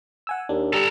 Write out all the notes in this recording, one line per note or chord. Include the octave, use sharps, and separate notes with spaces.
F#5 G#5 E6
D#2 D4
G3 A4 A#5